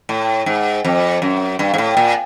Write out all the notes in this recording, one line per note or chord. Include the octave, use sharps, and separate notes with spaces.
A2
G#2
F2
F#2
G2
G#2
A2
A#2